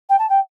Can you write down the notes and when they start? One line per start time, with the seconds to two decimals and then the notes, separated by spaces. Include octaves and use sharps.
0.09 G5
0.19 A5
0.29 G5